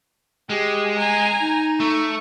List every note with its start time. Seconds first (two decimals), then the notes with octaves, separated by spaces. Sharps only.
0.50 G#3 G4 G#4
0.99 G#5 A#5
1.41 D#4
1.80 A3 C#6